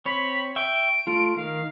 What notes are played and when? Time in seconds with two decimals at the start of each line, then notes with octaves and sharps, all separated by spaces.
0.06 C4 C#5 B5
0.56 E5 G5 C#6 D7
1.07 A3 F4
1.36 D#3 F5